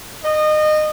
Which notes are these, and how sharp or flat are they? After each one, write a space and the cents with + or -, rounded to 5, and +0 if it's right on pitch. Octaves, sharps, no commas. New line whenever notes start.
D#5 -25